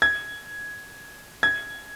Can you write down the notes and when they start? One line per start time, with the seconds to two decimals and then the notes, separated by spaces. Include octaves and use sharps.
0.02 G#6
1.43 G#6